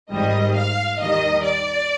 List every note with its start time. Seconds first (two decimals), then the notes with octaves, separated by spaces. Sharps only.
0.11 G#1 G#2 D#3 G3 D#5
0.55 F5
0.99 D#2 D#3 G3 D#5
1.43 D5